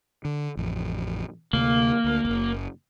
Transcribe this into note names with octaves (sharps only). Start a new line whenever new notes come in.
D3
A1 F2
D2 C3 A3 A#3
D2
F#1 C#2